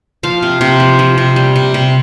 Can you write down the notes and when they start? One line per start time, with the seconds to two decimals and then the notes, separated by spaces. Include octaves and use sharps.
0.23 F3 F5
0.42 C3
0.61 C3
0.80 F3
0.99 F3
1.18 C3
1.36 G3
1.56 C3
1.74 C3